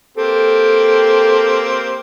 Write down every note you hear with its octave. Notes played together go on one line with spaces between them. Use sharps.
A#3 C4 G4 A4